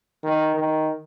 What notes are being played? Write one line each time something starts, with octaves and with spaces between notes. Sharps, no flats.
D#3
D#3